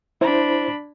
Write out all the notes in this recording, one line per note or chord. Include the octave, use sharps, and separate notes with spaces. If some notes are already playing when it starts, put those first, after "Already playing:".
D4 E4 C5 B5